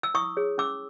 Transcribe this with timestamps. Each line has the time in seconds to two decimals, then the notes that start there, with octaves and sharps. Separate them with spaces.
0.03 E6
0.14 E4 C#6 D#6
0.37 G#4 C#5
0.58 C#4 D6 E6